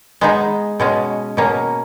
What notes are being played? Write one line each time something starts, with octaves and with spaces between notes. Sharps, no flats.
G#3 B3 D#4 G#4
B2 G#3 C#4
B2 A#3 C#4